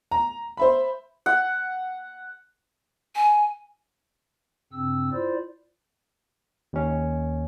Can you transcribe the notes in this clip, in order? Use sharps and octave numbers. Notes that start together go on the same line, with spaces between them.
A#5
C5 E5 B5
F#5
G#5
G2 C#3 C4 E6
E4 F4 C5 D5
D#2 C#4